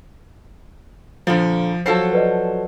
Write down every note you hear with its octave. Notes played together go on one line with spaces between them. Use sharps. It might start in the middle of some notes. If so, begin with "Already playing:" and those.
A#2 D3 F3
F3 F#3 A4 C5 C7
B4 D5 D#5